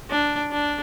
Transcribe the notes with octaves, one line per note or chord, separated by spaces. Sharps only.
D4
D4